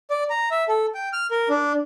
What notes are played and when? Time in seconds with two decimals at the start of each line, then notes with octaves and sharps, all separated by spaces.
0.10 D5
0.30 A#5
0.51 E5
0.68 A4
0.95 G5
1.13 F6
1.31 A#4
1.49 D4